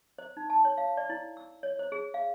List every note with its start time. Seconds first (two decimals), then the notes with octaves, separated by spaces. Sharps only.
0.18 C5
0.37 D#4
0.50 A5
0.65 C#5
0.78 F5
0.97 D5
1.10 E4
1.37 E6
1.63 C#5
1.79 C5
1.92 G#4
2.14 F5